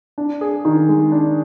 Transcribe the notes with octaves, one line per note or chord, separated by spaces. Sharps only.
D4
G#4
D#3
G#3
D4